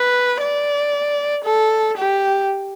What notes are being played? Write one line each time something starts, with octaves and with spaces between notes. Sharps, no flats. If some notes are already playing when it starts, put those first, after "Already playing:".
Already playing: B4
D5
A4
G4